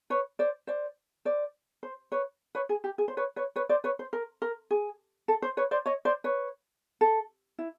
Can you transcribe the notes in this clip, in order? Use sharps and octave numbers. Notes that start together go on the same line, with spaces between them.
B4 C#5
C5 D5
C5 D5
C5 D5
C5
B4 C#5
B4 C#5
G#4
G4
G#4
C5
B4 C#5
B4 C#5
B4 C#5
C5 D5
B4 C#5
C5
A#4
A#4
G#4
A4
C5
B4 C#5
C5 D5
C#5 D#5
C5 D5
B4 C#5
A4
E4